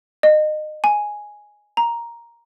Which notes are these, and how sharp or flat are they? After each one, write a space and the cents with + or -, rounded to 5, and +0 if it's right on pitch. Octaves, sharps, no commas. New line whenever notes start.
D#5 -25
G#5 +0
A#5 +5